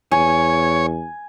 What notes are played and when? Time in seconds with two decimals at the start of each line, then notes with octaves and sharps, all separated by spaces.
0.12 E2 C#5 G#5